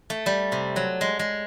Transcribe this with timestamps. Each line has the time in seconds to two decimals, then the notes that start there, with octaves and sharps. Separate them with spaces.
0.10 A3
0.26 G3
0.52 C3
0.76 F#3
1.01 G#3
1.19 G#3